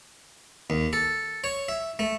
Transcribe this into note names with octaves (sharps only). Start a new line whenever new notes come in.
D#2
A4
C#5
E5
A3